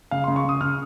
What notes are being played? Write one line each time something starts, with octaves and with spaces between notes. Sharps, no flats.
C#3 F5
C#3 C6
C#6
C#3 D#6
C#3 F6